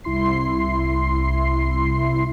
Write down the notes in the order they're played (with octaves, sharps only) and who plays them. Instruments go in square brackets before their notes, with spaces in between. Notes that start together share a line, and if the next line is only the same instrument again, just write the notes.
[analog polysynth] C2 E4 C6 C7